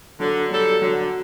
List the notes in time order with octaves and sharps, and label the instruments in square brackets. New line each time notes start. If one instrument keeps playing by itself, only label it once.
[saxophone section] D3 [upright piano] F#3
[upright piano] F#3 [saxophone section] G3 D4 A4
[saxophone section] D3 [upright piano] F#3